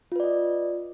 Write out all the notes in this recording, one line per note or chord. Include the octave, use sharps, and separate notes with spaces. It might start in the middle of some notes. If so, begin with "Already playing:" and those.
F4 B4 D5 D#5